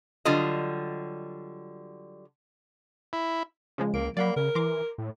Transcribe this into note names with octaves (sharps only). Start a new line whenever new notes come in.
D3 F#3 G3 F4 D5 D#5
E4
C#3 F3 G#3
C#2 A#3 D7
F#3 A#3 D5 F#5 B5
C#3 A#4
E3 A#5 C6 D6
A2